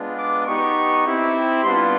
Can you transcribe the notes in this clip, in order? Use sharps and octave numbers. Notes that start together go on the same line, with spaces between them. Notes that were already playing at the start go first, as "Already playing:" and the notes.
Already playing: G#3 B3 D4 F4
D6
B3 D#4 G4 C#6
C4 E4 G4
G3 B3 D4 F4 C6